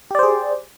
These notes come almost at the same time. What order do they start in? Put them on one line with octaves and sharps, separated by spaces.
G4 D5 C5 G#4